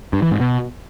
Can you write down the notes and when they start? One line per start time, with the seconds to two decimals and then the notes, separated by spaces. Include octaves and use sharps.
0.13 G2
0.22 E3
0.31 G#2
0.40 B2